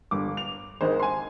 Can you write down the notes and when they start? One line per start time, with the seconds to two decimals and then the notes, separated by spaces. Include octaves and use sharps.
0.11 G1 D6
0.37 F7
0.81 G#1 D#3 G#3 C5
0.99 G#5 C6